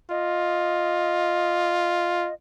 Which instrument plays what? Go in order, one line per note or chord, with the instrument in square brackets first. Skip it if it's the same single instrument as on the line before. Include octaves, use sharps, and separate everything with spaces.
[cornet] F4 [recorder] D#5